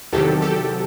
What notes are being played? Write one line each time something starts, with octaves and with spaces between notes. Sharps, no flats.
E2 C3 D#3 F#3 G4 A4
G4 A4